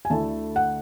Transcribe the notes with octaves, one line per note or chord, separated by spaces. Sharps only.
G#5
D2 D3 A3 E4 A5
F#5